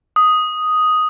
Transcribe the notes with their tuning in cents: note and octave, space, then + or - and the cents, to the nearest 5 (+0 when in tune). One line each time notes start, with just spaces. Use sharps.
D#6 +0